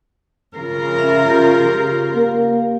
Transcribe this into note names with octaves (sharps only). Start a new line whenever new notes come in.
C#3 F4 A#4
C#4 E5 F5
G4
A#3